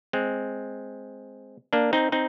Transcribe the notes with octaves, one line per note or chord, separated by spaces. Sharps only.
G#3 C4
A#3 D4
C4 D#4
C4 D#4